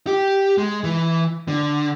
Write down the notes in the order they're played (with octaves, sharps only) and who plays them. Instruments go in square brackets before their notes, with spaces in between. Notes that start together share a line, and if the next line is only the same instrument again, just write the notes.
[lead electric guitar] G4
G#3
E3
D3